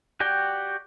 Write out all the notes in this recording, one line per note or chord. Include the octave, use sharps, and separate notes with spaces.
F#4 G4 D5 G5